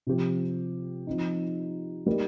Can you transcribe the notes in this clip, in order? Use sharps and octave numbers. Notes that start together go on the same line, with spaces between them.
C3 F3 C4 G4
F3 C4 D#4
G3 A#3 D#4